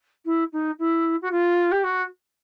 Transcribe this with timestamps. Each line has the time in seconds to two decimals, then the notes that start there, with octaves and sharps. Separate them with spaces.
0.25 E4
0.52 D#4
0.78 E4
1.21 F#4
1.31 F4
1.71 G4
1.83 F#4